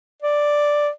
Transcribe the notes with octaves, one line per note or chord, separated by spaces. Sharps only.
D5